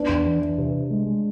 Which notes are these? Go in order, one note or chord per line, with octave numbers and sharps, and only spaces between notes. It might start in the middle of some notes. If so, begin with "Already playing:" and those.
Already playing: B3 D4
E2
E3
E3
C3
C3
G#3
G#3